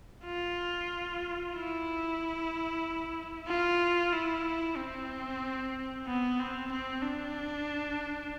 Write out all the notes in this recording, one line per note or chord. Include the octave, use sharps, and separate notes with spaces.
F4
E4
F4
E4
C4
B3
C4
C4
D4